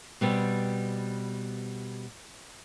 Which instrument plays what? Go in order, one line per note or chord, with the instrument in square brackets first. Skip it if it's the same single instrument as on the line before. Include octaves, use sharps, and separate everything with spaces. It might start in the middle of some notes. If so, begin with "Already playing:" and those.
[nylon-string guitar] B2 G3 B3 C4